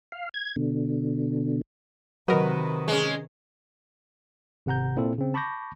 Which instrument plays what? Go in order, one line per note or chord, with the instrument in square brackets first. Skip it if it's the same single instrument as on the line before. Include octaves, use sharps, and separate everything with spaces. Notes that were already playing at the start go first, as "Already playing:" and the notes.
[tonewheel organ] F5
G#6
B2 D3
[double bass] C3 D#3 [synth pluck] F#3 A#4 [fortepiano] F#4 B4 D#5
[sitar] G#3 C#4
[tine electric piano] G#1 C3 F#5 A#5 G6
A#2 C4 E4 F4 A4
C#3 C4
A5 B5 C#6 D6 G6 A#6